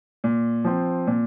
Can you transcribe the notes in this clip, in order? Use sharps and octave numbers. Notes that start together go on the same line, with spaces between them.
A#2
F3 C4
A#2